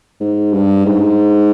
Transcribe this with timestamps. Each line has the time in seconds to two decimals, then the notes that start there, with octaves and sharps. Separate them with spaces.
0.20 G#2
0.53 G2
0.86 G#2